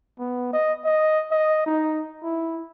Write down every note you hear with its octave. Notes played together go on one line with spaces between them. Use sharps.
B3
D#5
D#5
D#5
D#4
E4